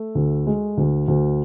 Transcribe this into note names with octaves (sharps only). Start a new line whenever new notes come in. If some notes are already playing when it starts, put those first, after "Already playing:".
Already playing: A3
D2
G#3
D2
D2